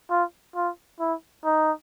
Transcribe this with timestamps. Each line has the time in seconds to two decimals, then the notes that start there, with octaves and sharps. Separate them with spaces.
0.10 F4
0.55 F4
1.00 E4
1.45 D#4